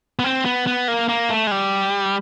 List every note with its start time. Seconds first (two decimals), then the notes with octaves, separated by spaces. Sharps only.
0.19 B3
0.24 C4
0.45 B3
0.67 B3
0.88 A#3
1.09 A#3
1.30 A3
1.47 G#3
1.51 G3